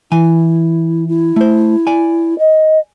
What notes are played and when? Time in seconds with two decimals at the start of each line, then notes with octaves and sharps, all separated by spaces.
0.12 E3 E4 G#5
1.09 E4
1.36 A3 C5
1.87 D5 G#5
2.39 D#5